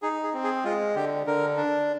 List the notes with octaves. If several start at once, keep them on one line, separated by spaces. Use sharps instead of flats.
D#4 G#4
G#4
C4
G#4
G#3 F4
D3 G4
D3 A#4
D4